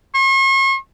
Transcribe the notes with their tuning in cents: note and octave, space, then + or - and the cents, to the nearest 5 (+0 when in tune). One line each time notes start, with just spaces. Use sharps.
C#6 -45